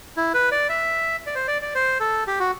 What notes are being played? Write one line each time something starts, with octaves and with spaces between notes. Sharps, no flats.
E4
B4
D5
E5
D5
C5
D5
D5
C5
A4
G4
F#4